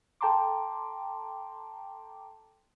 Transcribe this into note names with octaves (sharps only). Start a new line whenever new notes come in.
A4 G5 A5 A#5 C6 D6